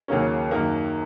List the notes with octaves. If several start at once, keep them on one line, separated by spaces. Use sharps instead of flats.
D#2 C#3 F#3 A#3 C#4
F#2 D#3 A#3